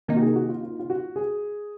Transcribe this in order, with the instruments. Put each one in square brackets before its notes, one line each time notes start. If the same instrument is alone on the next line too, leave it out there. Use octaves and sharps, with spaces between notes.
[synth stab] C3 D#3 A#3 D#4 [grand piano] A#4
[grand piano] F#4
G#4
F#4
F4
F4
F4
F#4
G#4